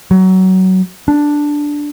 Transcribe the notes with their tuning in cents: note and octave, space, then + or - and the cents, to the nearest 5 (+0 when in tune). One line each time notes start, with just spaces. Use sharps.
F#3 +20
D4 +0